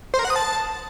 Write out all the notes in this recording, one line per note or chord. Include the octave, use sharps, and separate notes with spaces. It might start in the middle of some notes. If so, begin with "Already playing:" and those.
C5
A#4
F#5
D#6
A5